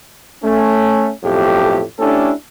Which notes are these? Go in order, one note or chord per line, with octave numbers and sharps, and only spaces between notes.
A3 C#4
B1 F2 A2 A3 G4
A3 C#4 D4 E4 G4 A4